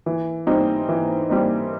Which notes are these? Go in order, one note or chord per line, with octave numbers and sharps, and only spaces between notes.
E3
G3 C4 D#4
E3
G3 C4 D#4